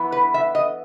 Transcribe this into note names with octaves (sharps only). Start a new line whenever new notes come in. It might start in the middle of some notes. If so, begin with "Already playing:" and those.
Already playing: E3 B3 E4
B4
E5
D#5